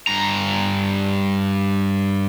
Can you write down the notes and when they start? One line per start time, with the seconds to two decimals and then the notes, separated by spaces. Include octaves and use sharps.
0.07 G2 A#5